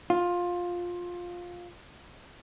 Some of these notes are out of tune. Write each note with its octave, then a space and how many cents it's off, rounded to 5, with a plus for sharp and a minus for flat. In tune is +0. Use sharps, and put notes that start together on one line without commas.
F4 +15